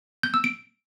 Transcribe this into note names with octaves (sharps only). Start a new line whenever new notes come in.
G6
E6
D7